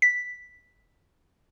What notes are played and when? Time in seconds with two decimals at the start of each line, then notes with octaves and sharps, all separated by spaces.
0.02 B6